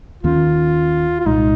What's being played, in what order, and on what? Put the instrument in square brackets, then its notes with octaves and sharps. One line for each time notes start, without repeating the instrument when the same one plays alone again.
[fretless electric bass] D#2 D#3 A#3 C#4 [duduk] F4
[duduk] F4
[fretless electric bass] C2 A#2 G#3 [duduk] D#4